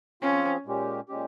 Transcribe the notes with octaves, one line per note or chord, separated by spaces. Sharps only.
F3 C4 C#4 F4 G#4
A#2 G#3 C#4 G4
A#2 G#3 C#4 G4